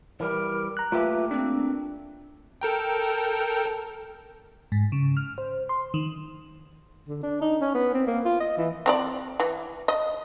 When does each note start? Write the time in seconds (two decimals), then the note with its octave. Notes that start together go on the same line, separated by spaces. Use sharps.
0.20 E3 G3 A#4
0.77 A#5 F#6
0.92 A3 A#3 F4 G4 B4 E5
1.31 C4 D4
2.61 A4 A#4 G5
4.72 G#2
4.92 C#3
5.17 F6
5.38 C5
5.69 C6
5.94 D#3
7.08 D3
7.23 D4
7.41 D#4
7.61 C#4
7.74 B3
7.93 C4
8.07 A#3
8.25 F4
8.40 D#5
8.57 E3
8.86 C4 C#5 D5
9.40 E3
9.88 D#5